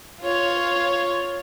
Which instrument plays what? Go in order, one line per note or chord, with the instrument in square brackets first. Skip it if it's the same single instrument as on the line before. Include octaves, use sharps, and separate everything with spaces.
[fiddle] F4 C#5